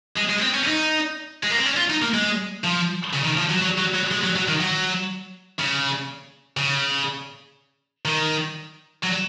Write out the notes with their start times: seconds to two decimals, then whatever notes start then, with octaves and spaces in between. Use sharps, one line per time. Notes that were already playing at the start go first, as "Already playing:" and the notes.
0.17 G#3
0.30 G#3
0.42 C4
0.54 C#4
0.67 D#4
1.43 G#3
1.51 A#3
1.58 C4
1.66 C#4
1.77 F4
1.90 D#4
2.02 A#3
2.14 G#3
2.64 F3
3.13 C#3
3.25 D#3
3.37 F3
3.50 F#3
3.62 F#3
3.78 F#3
3.95 F#3
4.11 G#3
4.24 F#3
4.36 F#3
4.48 D#3
4.60 F#3
5.59 C#3
6.57 C#3
8.05 D#3
9.04 F#3